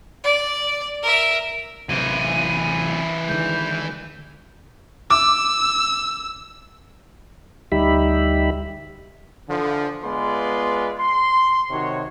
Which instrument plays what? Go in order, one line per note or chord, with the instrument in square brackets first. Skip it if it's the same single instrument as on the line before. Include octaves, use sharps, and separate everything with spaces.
[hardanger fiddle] D5
A#4 E5
[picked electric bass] A1 C3 F#3 [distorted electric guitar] E3 C5 [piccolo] D#7
[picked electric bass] D3 D#3 G#3 [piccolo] G6
[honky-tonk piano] D6 [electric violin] E6
[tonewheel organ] D2 G3 D#4 G4 E5 B5
[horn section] D3 E3 F3
G#3 B3 F4 B4 D5 C6
C6
C3 D#3 F#4 C#5